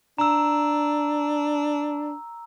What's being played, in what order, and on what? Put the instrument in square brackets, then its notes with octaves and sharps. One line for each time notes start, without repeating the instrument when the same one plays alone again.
[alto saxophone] D4 [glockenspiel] A#5 E6